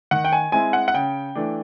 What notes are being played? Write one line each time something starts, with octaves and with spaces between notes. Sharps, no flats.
D#3 F#5
G5
G#5
G#3 C4 E4 G#5
F#5
F#5
C#3 G5
E3 A3 D4